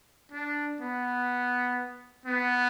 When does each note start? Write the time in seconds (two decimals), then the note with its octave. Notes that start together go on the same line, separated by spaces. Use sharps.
0.32 D4
0.81 B3
2.26 B3